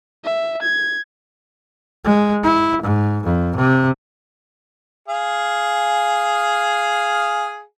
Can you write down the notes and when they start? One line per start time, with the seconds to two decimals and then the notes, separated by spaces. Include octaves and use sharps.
0.24 E5
0.62 G#6
2.05 G#3
2.43 E4
2.82 G#2
3.24 F2
3.56 C3
5.09 G#4 F5